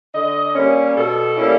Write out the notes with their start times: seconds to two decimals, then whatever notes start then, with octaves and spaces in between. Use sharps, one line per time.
0.14 D3 D#5
0.55 G3 A#3 C#4
0.97 B2 A4
1.37 G3 A#3 C#4 E4